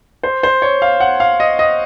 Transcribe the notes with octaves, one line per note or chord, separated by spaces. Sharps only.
C5
C5
C#5
F5
F#5
F5
D#5
D#5